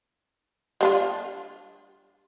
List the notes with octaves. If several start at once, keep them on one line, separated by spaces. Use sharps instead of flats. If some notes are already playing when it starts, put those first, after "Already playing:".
G3 D4 F4